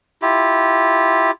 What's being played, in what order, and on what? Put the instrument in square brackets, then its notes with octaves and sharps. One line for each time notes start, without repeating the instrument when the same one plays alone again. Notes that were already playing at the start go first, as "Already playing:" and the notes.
[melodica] E4 F4 G4